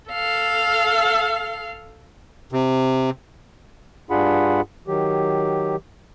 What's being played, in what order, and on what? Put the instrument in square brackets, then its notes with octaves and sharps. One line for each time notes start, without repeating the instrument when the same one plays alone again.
[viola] A4 F5
[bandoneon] C3
[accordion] G2 D4 F4 G#4 F#5 B5
D#3 F#3 G4